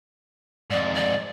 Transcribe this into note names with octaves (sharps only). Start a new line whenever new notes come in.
F2 G#2 D5
D5